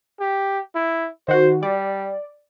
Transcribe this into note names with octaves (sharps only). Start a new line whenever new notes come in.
G4
E4
D#3 F#4 C5
G3 D5